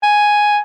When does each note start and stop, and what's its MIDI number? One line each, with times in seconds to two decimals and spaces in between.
0.03 0.60 80